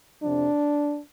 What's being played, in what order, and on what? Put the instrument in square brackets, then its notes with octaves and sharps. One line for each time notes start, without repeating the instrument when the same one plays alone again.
[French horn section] F2 C3 F3 D4